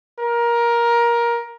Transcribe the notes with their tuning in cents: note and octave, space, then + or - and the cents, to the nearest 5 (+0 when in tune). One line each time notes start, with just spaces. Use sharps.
A#4 +20